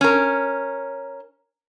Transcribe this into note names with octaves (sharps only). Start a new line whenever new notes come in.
C#4 A#4